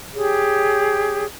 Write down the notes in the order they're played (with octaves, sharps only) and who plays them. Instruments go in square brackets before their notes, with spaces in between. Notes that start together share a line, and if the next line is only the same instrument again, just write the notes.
[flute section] G4 G#4 C#5